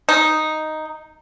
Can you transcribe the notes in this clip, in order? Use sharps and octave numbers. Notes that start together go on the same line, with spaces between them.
D#4